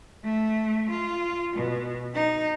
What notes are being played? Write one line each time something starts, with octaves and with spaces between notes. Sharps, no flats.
A3
F4
B2
D#4